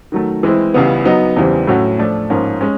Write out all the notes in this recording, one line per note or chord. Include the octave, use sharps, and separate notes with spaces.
D#3 F#3 A3
E3 G#3 C4 E4
C#2 C#3 E3 G3 B3
F#3 B3 D#4
E2 C#3 E3 G3 C4
A2 F#3 A3 C#4 F#4
F3 A3 D4
G#2 F3 A#3 C#4
G#3 C#4